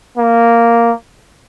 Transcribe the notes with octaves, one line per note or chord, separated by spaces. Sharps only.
A#3